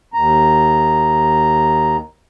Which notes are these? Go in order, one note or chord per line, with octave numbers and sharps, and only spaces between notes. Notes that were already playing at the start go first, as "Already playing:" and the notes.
D#2 A#5